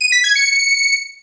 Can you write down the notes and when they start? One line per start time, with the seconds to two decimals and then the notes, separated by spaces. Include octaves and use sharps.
0.01 D#7
0.12 B6
0.24 G#6
0.35 C#7